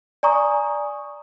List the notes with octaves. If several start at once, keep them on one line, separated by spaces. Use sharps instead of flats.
D5 G#5 A#5 C#6 D#6